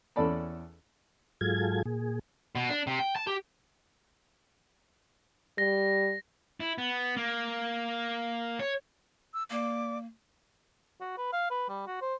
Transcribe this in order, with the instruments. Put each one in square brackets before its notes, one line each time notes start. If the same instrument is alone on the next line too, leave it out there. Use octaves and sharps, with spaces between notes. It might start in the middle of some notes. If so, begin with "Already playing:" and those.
[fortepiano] E2 C#4 A4 D5 A5 B5
[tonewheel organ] G#2 F#3 F4 G#4 A4 G#6
A#2 G#4
[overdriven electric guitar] B2
D4
C3
G5
A5
G4
[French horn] G3 [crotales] A#6
[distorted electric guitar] E4
B3
A#3
C#5
[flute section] E6
[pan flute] A#3 [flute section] D5 D6
[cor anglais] F#4
B4
F5
B4
G3
F#4
C5